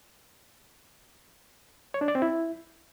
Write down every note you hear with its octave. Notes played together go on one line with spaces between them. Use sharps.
C#5
D4
D5
C4
E4